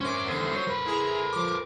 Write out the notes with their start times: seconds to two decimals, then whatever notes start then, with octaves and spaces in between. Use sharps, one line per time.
0.01 C#4 A#4 C5 D6
0.26 E2 D3 C5 D#7
0.53 F#3
0.67 A#4 B4
0.86 E4 G#4 A#5
1.33 F3 D6